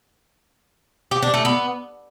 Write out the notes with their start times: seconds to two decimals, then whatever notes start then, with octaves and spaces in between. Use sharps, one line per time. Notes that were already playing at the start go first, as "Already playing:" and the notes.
1.11 G4
1.22 D4
1.34 A3
1.45 B3